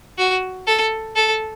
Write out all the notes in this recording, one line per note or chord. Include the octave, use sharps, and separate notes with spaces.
F#4
A4
A4